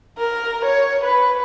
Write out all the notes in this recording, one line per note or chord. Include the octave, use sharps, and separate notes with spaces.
A#4
C#5
B4